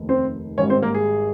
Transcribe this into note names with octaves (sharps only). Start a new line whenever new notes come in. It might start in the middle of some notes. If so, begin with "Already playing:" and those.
Already playing: F1 D#2 D#3
C4 C5
G#1 G#2 G3 C#4 C#5
C4 C5
A#3 A#4
G#4